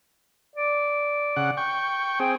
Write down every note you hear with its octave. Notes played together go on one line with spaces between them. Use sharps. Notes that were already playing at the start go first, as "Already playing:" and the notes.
D5
C#3 F#5
G5 C#6
C4 G#4 G5